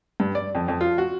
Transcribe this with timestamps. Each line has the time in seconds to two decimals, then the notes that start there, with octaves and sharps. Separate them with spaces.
0.20 G2
0.35 D5
0.55 F2
0.68 F2
0.81 F4
0.98 F#4